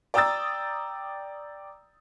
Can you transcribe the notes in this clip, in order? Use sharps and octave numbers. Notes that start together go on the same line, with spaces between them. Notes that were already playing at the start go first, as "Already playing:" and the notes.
D5 G5 A#5 D#6 E6 A6